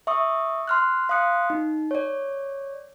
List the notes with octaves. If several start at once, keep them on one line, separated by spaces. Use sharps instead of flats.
E5 C#6 D#6
C6 F6 F#6
F5 C6 D#6 F#6 C#7
D#4
C#5 D5